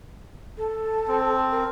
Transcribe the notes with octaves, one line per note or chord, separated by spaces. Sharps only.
A4
C4
A5
A#4